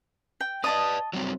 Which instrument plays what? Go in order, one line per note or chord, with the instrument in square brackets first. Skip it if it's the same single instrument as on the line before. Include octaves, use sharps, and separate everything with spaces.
[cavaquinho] G5
[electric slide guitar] B4 D5 [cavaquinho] D#5 A5 D#6
[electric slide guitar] F#3 G3 C4